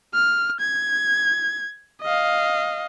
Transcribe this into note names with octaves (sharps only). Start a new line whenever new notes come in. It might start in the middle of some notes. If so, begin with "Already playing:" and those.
F6
G#6
D#5 F5